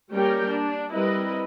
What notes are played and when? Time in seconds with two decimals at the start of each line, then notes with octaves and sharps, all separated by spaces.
0.12 G3 A#3 C#4 G4 A#4 G5
0.50 D4
0.92 G3 C4 E4 A#4 B4 D#5